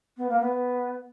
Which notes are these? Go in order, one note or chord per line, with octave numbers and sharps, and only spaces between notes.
B3
A#3
B3